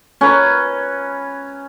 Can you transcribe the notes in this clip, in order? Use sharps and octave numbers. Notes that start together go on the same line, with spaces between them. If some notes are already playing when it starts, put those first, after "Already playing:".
C#4 B4 A#5